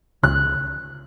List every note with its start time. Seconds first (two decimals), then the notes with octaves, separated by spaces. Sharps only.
0.23 C#2 F#6